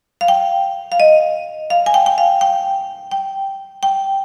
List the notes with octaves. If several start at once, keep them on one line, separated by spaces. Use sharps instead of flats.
F5
G5
F5
D#5
F5
G#5
G5
G5
F5
G5
G5
G5